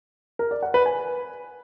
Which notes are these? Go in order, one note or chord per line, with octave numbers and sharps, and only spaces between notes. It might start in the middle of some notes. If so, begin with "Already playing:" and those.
A#4
D5
F#5
B4
G#5